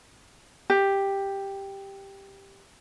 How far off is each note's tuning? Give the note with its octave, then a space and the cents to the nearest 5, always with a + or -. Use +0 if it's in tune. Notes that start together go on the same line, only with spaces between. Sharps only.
G4 +5